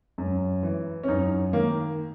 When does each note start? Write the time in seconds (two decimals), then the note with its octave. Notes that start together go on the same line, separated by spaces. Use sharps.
0.18 F#2
0.63 E3
1.03 C#4
1.08 F#2 D#4
1.53 D#3 A#3